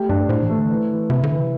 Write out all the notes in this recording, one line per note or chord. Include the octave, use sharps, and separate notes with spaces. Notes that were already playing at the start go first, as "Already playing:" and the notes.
Already playing: A3 G4
G2 D4
A2 C5
E3
A3
D3
E3
E3
C3 E4
D3
E3
C3